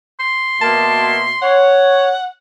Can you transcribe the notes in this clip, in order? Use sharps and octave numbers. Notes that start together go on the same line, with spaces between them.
C6
B2 A#3 E5 A5
C#5 F#5